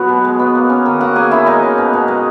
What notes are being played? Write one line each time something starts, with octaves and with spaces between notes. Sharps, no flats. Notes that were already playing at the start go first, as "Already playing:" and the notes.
Already playing: F#3 B3 F#4
B2
G#3
B3
A#3
C#4
D#3
D#3 F#4 F#5
A#3 G#4 G#5
C#4 E4 E5
G#3 D#4 D#5
C#4
B2
B2
G#3